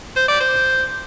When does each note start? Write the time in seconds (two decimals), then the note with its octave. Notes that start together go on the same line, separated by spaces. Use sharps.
0.16 C5
0.28 D5
0.40 C5